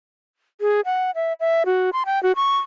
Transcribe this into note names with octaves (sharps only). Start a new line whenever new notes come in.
G#4
F#5
E5
E5
F#4
C6
G5
F#4
C#6